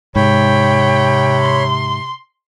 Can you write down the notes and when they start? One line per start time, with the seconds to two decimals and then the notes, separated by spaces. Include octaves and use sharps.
0.16 G#2 C3 C#5 G5 B5
1.41 C6